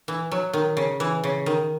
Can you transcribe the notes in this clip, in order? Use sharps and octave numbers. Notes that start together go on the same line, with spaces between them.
E3
F#3
D#3
C#3
E3
C#3
D#3